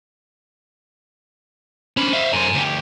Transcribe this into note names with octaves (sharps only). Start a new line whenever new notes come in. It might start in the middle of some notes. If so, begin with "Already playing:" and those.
C#4 D4 C5 B5
E5 F5
F#2 C5 G#5 A#5
D2 G4